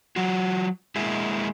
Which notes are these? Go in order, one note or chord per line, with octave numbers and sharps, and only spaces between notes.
F#3 F4 F#4
G#3 A#3 E4 G#4